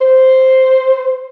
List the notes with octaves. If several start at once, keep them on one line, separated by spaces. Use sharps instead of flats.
C5